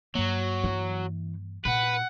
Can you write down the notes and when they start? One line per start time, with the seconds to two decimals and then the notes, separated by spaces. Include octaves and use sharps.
0.15 G2 F#3 A#3
0.64 E3
1.65 A#2 B4 F#5